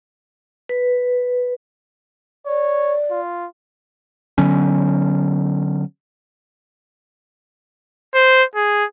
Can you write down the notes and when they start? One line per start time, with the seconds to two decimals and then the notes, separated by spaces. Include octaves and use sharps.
0.69 B4
2.46 C#5 D5
3.11 F4
4.38 D3 F#3 B3 C#4
8.15 C5
8.56 G#4